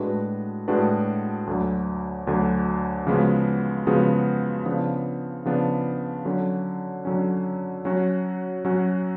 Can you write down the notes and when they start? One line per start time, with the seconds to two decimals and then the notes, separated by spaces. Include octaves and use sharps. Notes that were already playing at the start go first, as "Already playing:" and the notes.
Already playing: A2 G#3 D4 F#4 B4
0.68 A2 G#3 D4 F#4 B4
1.47 D2 D3 F#3
2.27 D2 D3 F#3
3.07 C#3 F3 G#3 B3 F#4
3.87 C#3 F3 G#3 B3 F#4
4.66 C#3 F3 B3 D4
5.45 C#3 F3 B3 D4
6.25 D3 F#3 C#4
7.05 D3 F#3 C#4
7.85 F#3 C#4 F#4
8.65 F#3 C#4 F#4